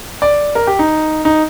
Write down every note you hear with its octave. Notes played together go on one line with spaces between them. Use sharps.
D5
A#4
G4
D#4
D#4